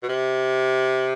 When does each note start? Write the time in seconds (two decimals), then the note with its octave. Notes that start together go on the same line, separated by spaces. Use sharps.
0.03 B2
0.09 C3